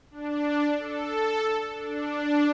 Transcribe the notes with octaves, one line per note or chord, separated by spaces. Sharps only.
D4
A4
D4